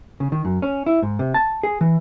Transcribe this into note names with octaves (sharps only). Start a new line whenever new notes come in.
C#3
D#3
F#2
C#4
E4
G#2
C3
A5
G#4
E3